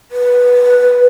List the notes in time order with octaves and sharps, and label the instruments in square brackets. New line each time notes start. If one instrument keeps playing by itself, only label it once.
[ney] B4